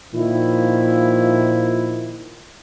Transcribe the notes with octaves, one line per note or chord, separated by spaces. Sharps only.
A#2 D#3 F3 E4